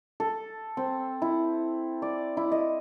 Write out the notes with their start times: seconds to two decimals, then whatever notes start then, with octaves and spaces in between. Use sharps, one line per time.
0.20 A4
0.77 C4
1.22 E4
2.02 D5
2.37 E4
2.52 D#5